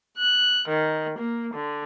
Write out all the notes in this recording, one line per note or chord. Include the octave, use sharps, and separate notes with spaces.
F#6
D#3
A#3
D3